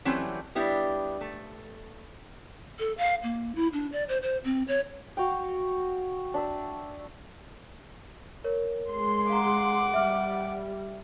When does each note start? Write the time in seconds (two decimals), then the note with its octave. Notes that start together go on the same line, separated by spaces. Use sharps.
0.05 E3 F#3 G3 A3 C4 C#4
0.55 G3 B3 D4 E4 G4
1.21 A3
2.79 A4
2.98 F5
3.23 A#3
3.55 E4
3.73 D4
3.92 D5
4.09 C5
4.22 C5
4.44 C4
4.68 C#5
5.17 F#4 F5 G5
6.34 D4 E5 E6
8.44 A#4 C#5
8.90 G#3 C6
9.30 F5 F#5 A#5 D6
9.94 G3 E5 F6